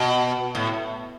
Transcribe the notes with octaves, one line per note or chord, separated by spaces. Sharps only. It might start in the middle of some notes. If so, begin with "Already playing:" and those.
Already playing: B2
A2